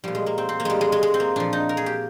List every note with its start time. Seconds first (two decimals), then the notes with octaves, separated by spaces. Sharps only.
0.04 A#2 F3 G3
0.15 G#3
0.26 A#3
0.38 C4
0.49 C4
0.60 A#3
0.65 G3 G#3
0.81 G#3
0.92 G#3
1.03 G#3
1.14 C4
1.20 A#3
1.36 A#2 F3 D4
1.53 D#4
1.69 A#4
1.77 G#4
1.86 G4